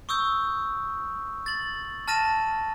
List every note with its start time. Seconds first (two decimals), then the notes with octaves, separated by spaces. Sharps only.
0.09 C#6 D#6 E6 G6
1.46 A6 F#7
2.08 A5 F6 A6 A#6 D#7 E7